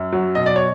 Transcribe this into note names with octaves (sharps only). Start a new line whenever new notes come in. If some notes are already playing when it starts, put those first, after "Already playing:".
Already playing: F#2
F#3
B2 D#5
D5
C#5